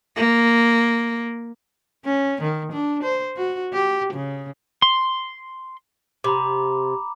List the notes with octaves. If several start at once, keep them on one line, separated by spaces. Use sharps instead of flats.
A#3
C#4
D#3
D4
C5
F#4
G4
C#3
C6
C3 A#5 B5 D6